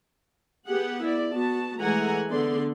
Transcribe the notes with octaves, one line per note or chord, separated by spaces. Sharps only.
B3 G4 G#4 F#5
E4 D5
B3 F#4 A5
E3 G#3 A3 F#5 G#5 A#5
D3 B3 D5 C6